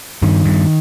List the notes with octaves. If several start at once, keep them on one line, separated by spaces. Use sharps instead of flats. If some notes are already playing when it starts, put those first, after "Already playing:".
G2 D#3
G2